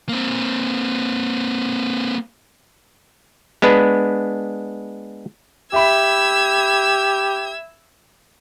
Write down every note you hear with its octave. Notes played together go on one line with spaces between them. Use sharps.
A#3 C4
G#3 B3 D4 B4
G4 E5 B5 E6 G#6